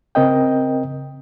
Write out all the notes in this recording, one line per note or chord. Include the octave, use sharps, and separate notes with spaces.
C#3 C4 A#4 D#5 G5